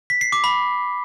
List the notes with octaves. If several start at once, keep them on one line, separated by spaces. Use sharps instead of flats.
B6
C7
D6
B5